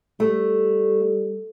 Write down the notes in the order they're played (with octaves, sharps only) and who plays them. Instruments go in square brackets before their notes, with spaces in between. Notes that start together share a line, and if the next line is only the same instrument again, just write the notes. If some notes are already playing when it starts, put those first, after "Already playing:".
[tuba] G3 [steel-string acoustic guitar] A3